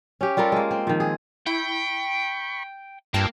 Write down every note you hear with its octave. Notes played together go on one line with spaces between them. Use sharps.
C#4 G4
G3 F4 A4 A#4
G#3 A#3
C4
D#3 F3
G#4
E4 G5 B5 C#6
G2 A#3 F4 G5 A5